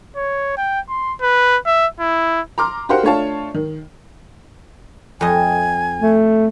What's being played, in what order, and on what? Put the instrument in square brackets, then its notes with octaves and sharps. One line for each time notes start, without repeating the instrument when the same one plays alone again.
[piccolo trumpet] C#5
G5
C6
B4
E5
E4
[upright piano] A#5 C6 D6 F6
F#4 G4 A#4 C5 F5 F#5
A3 D4 F4 C#5 F5 A5
D#3
[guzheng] F2 D#5 [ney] G#5
[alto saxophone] A3